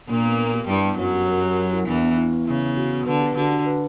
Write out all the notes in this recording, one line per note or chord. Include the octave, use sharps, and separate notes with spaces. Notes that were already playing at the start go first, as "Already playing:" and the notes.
A#2 A#3 D4
B3
A#4
G4
G2 G3 E4
B3
F#2 F#3 C#5
G4
A#4
G4
A#4
E4
E2 E3 D4
B3
E4
B3
C#3 E4
B3
F#4
B3
D3 B4
G4
D3 F#4
D4
B4